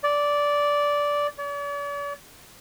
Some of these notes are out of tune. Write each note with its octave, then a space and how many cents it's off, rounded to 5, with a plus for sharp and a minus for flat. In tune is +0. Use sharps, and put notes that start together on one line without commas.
D5 -10
D5 -45